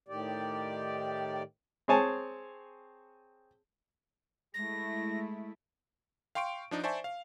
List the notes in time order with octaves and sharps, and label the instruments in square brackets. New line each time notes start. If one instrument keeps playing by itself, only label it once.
[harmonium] A2 D#3 G4 D5
[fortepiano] C4 G#4 C#5 G#5 A5
[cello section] G#3 A3 E4 [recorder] A#6
[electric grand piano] F5 G5 C6 C#6 D7
F3 D4 D#4
C5 D5 E5 G#5 A5 C#6
F5